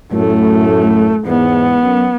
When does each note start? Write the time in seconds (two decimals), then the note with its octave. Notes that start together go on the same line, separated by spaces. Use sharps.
0.12 F#2 A2 A3
1.26 E2 G#2 B3
1.83 F#2